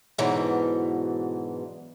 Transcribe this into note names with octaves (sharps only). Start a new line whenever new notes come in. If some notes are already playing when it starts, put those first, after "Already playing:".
G#2 B2 D3 E3 F#3